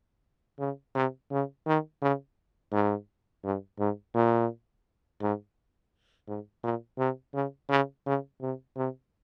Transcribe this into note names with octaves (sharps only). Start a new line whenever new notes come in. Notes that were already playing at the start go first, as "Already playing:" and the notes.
C#3
C3
C#3
D#3
C#3
G#2
G2
G#2
A#2
G#2
G#2
A#2
C3
C#3
C#3
C#3
C3
C3